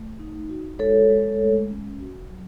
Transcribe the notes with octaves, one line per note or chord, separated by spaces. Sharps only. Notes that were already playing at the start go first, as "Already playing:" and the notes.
Already playing: A3
D#4
F#4
G#3 A4 C#5
G#3
A3
C#4
F#4
F#3